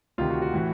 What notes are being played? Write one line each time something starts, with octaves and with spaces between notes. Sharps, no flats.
D2 C3 D#3 F4
F#4
F#4
A2 E3